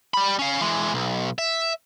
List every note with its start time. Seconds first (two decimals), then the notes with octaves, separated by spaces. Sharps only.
0.14 G3 B5
0.39 C#4 F5
0.61 E3 G#3
0.94 B1
1.39 E5